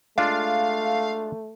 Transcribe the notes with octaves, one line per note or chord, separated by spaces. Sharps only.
G#3 A3 D4 F4 F5